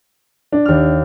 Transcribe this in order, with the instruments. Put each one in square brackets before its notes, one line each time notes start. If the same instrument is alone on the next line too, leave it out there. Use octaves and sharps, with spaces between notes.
[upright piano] D4
[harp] D#2 F6